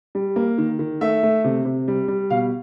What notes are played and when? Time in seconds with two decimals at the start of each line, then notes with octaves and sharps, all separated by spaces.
0.15 G3
0.36 A#3
0.58 D#3
0.79 D#3
1.01 A3 E5
1.23 A3
1.44 C3
1.65 C3
1.88 G3
2.08 G3
2.30 B2 F5